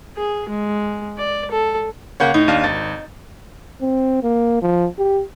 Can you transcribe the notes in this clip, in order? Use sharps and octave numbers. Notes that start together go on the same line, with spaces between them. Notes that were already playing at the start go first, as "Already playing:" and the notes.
G#4
G#3
D5
A4
C#3 A#3 C#5 F#5 G6
A2 D#4
D#2 D4 F5
G#1 A6
C4
A#3
F3
G4